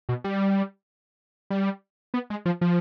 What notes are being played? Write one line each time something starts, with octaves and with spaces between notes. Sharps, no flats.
B2
G3
G3
B3
G#3
F3
F3